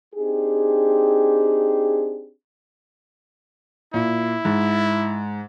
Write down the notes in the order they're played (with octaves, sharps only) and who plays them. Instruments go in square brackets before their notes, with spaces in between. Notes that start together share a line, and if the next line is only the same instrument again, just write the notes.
[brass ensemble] C4 D4 D#4 G4 G#4
[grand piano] A#2 [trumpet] E4
[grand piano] G#2